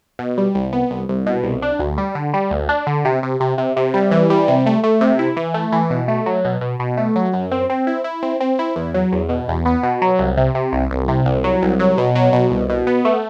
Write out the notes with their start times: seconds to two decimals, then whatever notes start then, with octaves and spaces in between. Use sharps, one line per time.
0.19 B2
0.38 G3
0.55 C2
0.73 B3
0.91 C2
1.09 C2
1.26 B2
1.44 C2
1.62 D4
1.79 D2
1.98 G3
2.15 D3
2.34 G3
2.51 D2
2.69 D4
2.87 D3
3.05 C3
3.23 C3
3.40 C3
3.58 C3
3.77 C3
3.94 G3
4.11 E3
4.30 G3
4.48 C3
4.66 A3
4.83 A3
5.01 C3
5.19 E4
5.37 E3
5.54 A3
5.72 E3
5.90 B2
6.08 A3
6.26 F#3
6.45 B2
6.61 B2
6.80 B2
6.97 A3
7.16 F#3
7.33 F#2
7.51 C4
7.70 C4
7.87 E4
8.04 E4
8.23 C4
8.41 C4
8.59 E4
8.76 E2
8.94 F#3
9.12 E2
9.29 B2
9.48 E2
9.66 B3
9.83 B2
10.02 F#3
10.19 C2
10.37 C3
10.55 C3
10.73 C2
10.91 C2
11.08 C3
11.26 C2
11.44 F#3
11.63 C2
11.79 F#3
11.98 B2
12.15 F#3
12.33 B2
12.51 C2
12.70 B2
12.87 B3
13.05 A3